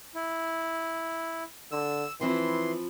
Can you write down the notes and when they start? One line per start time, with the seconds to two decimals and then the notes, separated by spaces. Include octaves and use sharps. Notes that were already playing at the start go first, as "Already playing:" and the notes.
0.15 E4
1.72 D3 E6
2.21 E3 F3 C4 E4 C6